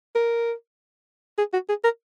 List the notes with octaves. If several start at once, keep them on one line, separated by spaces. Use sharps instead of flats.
A#4
G#4
F#4
G#4
A#4